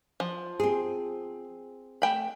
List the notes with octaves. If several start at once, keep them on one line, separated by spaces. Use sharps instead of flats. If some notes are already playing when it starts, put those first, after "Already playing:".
F3
C4 G#4
A3 G5 B5